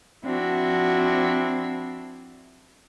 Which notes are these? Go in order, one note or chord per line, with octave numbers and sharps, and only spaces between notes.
F3 C4 D4 E4 F#4